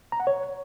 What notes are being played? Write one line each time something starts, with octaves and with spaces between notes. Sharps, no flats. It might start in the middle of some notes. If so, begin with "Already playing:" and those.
A#5
F#5
C#5